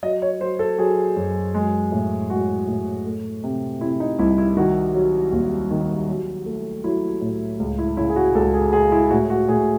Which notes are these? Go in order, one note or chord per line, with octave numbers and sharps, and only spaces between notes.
F#3 D#5
C#5
F#3 C5
A4
F#3 G#4
F#2
G#3
A2
G#3 F#4
A2
A3
C3
C3 E4
D#4
C2 E4
E4
D#3 F#4
F#3
D#2
D#3
F#3
A3
F#3 E4
A2
C#2
E4
C#3 E4
G#4
F#4
C#2 A4
G#4
G#3 G#4
E4
A2 F#4
F#4
A2 G#4